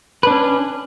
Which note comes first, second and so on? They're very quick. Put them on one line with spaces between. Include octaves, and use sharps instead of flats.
B4 D4 C#4